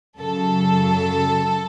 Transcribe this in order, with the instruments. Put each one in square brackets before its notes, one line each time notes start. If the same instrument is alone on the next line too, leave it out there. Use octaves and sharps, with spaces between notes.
[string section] F#2 C#3 F#3 A4